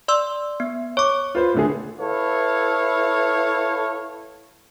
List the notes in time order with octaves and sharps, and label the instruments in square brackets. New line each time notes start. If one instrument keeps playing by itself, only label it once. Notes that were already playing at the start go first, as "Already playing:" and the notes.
[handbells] D5 C6 E6
B3
[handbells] C#5 D6 [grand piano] C#6
[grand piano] F4 B4 C5
A2 D3 G#4
[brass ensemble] E4 A4 B4 C#5 F5